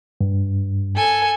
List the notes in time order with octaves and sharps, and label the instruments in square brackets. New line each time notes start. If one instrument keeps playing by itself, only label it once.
[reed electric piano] G2
[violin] A4 G#5